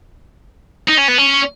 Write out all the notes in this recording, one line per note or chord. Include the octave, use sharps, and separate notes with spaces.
D#4
C#4
B3
C#4